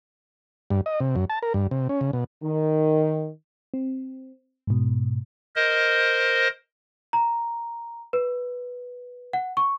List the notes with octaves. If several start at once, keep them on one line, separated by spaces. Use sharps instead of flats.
G2
D#5
C3
F#2
A5
A#4
G2
C3
C#4
C#3
B2
D#3
C4
G#2 B2
A#4 C5 D#5
A#5
B4
F#5
C#6